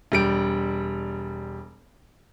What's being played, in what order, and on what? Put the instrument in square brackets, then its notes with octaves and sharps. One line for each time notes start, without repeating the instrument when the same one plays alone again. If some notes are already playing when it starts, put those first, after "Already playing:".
[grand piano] E1 G3 D7